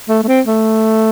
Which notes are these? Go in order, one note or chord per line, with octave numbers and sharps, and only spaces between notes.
A3
A3
C4
A3